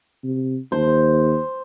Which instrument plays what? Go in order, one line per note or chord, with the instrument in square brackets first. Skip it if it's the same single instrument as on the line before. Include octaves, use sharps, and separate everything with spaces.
[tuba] C3
[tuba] D#2 [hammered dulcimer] C5